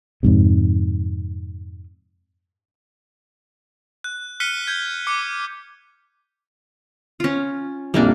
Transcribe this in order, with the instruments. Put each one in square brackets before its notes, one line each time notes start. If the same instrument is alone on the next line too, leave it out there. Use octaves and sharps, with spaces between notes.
[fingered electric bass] F2 G#2 C3
[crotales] F#6
F6 F#6 B6 C#7 D#7 G7
G6 G#6
D6 C#7 D#7
[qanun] C#4 F4
[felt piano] A#1 F2 A#2 [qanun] G3 A#3 D4